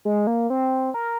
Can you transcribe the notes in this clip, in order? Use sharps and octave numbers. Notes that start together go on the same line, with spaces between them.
G#3
A#3
C4
A#4